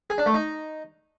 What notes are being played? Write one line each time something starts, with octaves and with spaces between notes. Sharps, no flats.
G#4
D4
A3
D#4